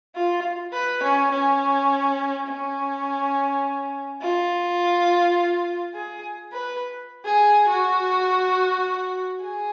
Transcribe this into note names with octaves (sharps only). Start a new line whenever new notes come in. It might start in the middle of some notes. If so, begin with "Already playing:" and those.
F4
B4
C#4
C#4
C#4
F4
G#4
B4
G#4
F#4
G#4